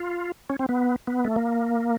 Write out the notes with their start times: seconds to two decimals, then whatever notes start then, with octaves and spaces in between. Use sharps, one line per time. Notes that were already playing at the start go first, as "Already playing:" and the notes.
Already playing: F4
0.50 C#4
0.59 C4
0.69 B3
1.07 B3
1.25 A3
1.36 A#3